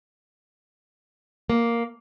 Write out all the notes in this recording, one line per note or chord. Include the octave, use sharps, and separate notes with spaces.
A#3